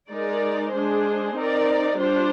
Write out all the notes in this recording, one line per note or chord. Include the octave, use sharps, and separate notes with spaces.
G#3 D#4 A#4 D5
G#3 D4 G#4 C5
C4 D#4 A#4 D5
G3 D4 F4 C5